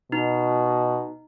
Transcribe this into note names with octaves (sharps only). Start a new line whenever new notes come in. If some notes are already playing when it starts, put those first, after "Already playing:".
B2 D#4